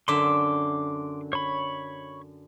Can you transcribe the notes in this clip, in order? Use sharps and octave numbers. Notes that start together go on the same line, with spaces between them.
F#2 D3 E5 C6 D6
C#5 B5